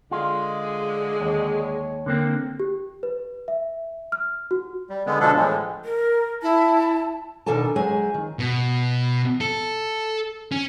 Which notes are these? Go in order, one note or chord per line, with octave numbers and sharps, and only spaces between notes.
D3 G#3 F4
D#2 C#5
D3 A#3 C4
G4
B4
E5
F6
F#4
G3
D3 G#3 B3
B2 D3 F3 G#3 D4 A4
A2 E3 F3 G#3
A#4
E4 A5
B2 D#3 D4 A4 G#5 A5
F#3 G#3 G#4 C5 G#5
D#3
B2
A4
C#4